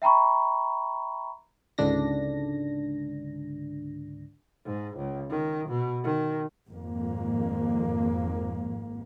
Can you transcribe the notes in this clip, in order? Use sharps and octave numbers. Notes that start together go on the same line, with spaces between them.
E5 G5 A#5 B5 C#6
C#2 G#2 D3 D4 A#6
G#2
C#2
D#3
B2
D#3
G#1 F2 G#2 A#3